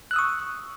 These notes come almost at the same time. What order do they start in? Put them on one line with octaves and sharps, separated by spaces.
F#6 E6 D#6 C#6